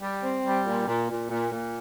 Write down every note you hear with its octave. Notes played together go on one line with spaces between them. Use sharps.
G3
C4
G3
A#2
A#2
A#2
A#2
A#2